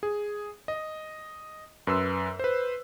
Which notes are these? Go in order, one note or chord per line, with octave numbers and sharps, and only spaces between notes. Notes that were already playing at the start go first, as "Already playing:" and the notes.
G#4
D#5
F#2 B4 C6 E6
B4 C5